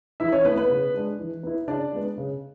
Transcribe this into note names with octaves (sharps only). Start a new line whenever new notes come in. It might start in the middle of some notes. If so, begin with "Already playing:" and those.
E3 E4 E5
C#4 C#5
A3 B3 E4 B4
B3 B4
C#3
G#3 D4
E3
B3 E4
C#3 D4 D5
G#3 B3
C#3